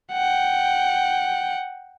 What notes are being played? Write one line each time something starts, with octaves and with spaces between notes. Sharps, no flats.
F#5 G5